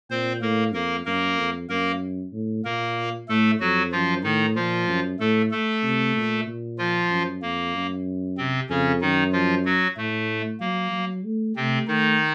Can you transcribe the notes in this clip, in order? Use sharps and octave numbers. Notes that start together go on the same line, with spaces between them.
A#2 C4 C5
A2 A#3 A#4
F2 A#3 A#4
F#2 A#3 A#4
F2
F#2 A#3 A#4
A2
A#2 A#3 A#4
A2 A3 A4
F2 F#3 F#4
F#2 F3 F4
A2 D#3 D#4
A#2 F3 F4
F#2
A2 A3 A4
A3 A4
C3
A#2
A#2
F3 F4
F#2
F2 A#3
F#2
C3 C4
F2 C#3 C#4
F#2 D#3 D#4
F3 F4
F#3 F#4
A2 A3
F#3 A#3
F#3
A3
C3 A3 C4
D#3 A3 D#4